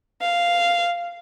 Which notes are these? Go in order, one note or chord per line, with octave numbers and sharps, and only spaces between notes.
F5